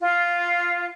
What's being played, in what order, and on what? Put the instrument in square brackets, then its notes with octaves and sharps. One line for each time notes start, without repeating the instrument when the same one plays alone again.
[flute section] F4